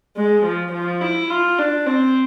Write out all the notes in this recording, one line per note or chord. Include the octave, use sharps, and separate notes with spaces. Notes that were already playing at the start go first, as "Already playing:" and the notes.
G#3
F3
F3
E4
F4
D4
C4